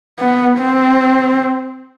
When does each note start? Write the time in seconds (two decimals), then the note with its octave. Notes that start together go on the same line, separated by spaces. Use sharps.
0.19 B3
0.58 C4